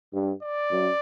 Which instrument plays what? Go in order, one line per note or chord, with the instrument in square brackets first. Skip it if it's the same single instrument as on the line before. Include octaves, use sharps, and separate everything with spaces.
[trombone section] G2
[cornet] D5
[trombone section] F#2